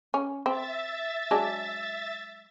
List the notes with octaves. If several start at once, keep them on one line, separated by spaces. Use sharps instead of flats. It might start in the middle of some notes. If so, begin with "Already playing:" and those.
C#4
C4 E5 A6
F#3 G#3 D4